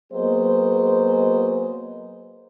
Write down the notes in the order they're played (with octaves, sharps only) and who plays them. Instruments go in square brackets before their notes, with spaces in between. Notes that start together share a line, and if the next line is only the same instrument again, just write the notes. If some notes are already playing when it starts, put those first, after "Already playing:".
[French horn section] F#3 A#3 B3 G#4 C5 D#5